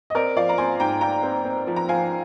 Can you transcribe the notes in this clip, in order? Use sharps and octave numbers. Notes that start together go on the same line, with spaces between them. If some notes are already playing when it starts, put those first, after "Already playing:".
D#5
C4 A#4 D5
F3 D5 F5
A#5
C4 G#5 C6
G#2 G5 A#5
G#2 G5 A#5
C4
C4
F3
A#5
F3 F5 G#5